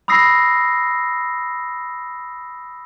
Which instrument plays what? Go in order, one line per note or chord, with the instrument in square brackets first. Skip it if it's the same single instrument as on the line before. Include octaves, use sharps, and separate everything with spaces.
[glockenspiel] B5 D#6 E6 A#6 C7